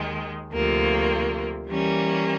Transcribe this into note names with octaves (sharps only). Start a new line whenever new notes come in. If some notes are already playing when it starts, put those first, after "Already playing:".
Already playing: D#2 D#3 G#3
D2 C3 F3 A#3
E3 G3 A#3 C#4